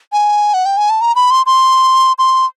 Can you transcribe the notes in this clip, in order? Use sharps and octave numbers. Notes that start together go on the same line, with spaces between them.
G#5
F#5
G5
G#5
A5
A#5
B5
C6
C6
C6